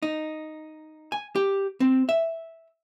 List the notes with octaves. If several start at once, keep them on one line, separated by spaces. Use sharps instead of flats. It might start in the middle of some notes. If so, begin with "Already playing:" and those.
D#4
G#5
G4
C4
E5